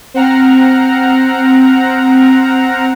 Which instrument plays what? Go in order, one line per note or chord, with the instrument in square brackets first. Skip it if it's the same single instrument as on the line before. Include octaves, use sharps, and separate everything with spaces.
[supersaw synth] C4 F#5 A#5 F6